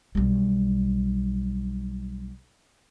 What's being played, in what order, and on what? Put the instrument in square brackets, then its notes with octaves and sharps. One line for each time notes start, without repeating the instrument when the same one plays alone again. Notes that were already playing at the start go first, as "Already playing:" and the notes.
[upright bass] B1 G3